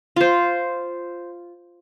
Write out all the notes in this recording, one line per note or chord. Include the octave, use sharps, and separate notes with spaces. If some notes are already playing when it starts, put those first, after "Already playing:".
F4 C5